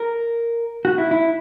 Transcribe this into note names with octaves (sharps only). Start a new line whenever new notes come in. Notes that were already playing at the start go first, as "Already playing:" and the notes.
Already playing: A#4
F#4
E4
E4